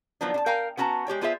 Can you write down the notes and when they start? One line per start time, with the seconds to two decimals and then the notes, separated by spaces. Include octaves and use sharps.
0.21 D#3 F3 F#3 B3 D4
0.34 D4 A5
0.46 A#4 F5 G5 G#5 A#5
0.77 B3 C#4 F#4 A5 A#5
1.07 G#3 G4 C#5 G5
1.21 B3 D4 F4 G#4 C5 E5